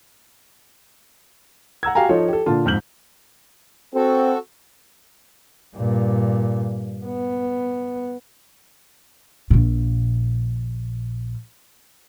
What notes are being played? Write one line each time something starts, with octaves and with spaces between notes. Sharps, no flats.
F#5 A#5 E6 G#6
F#4 G4 F5 G5 G#5 A#5
F3 D#4 F4 A4 C#5
G4 A4
A#2 D3 F4 A5
F2 G#2 F6 G6 F#7
C4 F#4 A4
G2 A#2
B3
A#1 A#2